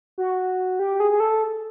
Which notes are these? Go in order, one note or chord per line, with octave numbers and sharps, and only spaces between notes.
F#4
G4
G#4
G#4
A4